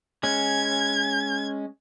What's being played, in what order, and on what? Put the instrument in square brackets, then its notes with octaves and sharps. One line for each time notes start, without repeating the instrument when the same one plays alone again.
[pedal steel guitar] G#3 C#4 [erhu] G#6